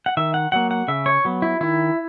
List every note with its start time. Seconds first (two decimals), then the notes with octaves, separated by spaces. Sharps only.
0.06 F#5
0.17 D#3 E5
0.34 F#5
0.52 F#3 A#3 F#5
0.71 F#5
0.88 C#3 E5
1.06 C#5
1.25 F#3 B3
1.42 E4
1.61 D#3 E4